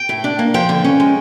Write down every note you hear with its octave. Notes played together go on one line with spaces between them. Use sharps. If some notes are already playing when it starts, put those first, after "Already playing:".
Already playing: G5
A2
D4
A#3
F3 G5
D3
C#4
G#3